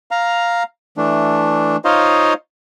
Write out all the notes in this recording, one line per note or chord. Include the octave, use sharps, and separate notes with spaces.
F5 A#5
E3 A3 D4
D#4 F4 C5 C#5 D#5 F5